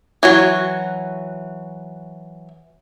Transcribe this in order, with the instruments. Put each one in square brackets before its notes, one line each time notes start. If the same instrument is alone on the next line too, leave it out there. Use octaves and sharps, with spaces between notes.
[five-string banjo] E3 F#3 F#4